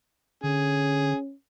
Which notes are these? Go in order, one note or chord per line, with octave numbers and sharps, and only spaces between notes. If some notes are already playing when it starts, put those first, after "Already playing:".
D3 C#4 G#4